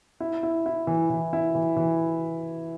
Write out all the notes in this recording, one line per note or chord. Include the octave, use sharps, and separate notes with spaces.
E4
E4
E4
E3
E3
E4
E3
E3